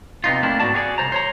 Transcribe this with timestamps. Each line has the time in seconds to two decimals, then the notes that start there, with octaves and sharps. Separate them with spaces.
0.24 C3 B3 D#4 F4
0.43 A3 A#3 C4 D4 E4
0.60 G#2 B3 F#4 D5 A5
0.74 F#4 G#4 C#5 D5
0.98 C2 C5 A#5
1.12 C5 C#5 A#5